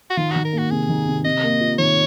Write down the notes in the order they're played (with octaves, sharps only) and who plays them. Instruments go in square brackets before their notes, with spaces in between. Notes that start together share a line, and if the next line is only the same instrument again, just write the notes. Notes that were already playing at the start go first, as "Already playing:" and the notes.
[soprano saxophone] F#4
[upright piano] D#3 [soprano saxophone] F4
[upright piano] D#3 [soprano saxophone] F#4
[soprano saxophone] A#4
[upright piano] A#3
[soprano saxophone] F#4
[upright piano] C3 [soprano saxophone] G#4
[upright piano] D#3
C3
[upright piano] C3 [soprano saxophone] D#5
[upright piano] A#3
F4
[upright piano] D#3 [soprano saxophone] C#5